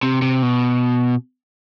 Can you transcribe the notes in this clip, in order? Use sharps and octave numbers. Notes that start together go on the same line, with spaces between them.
C3
C3
B2